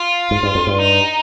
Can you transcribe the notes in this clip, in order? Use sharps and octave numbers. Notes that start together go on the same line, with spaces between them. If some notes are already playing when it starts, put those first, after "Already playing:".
Already playing: F4
G#2
G2
F2
G2
D#4